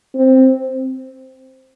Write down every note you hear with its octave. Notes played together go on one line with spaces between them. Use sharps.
C4